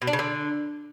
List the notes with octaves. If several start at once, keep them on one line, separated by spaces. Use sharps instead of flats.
B2
D4
C#3
D3